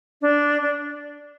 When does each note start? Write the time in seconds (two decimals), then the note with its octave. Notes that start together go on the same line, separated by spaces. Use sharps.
0.21 D4
0.61 D4